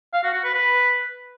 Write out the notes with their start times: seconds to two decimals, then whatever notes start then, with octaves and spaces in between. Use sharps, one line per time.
0.13 F5
0.24 F#4
0.34 F#4
0.44 B4
0.54 B4